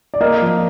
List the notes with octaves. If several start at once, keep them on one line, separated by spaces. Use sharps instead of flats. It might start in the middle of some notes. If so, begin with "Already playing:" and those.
D5
A#3 D#5
F3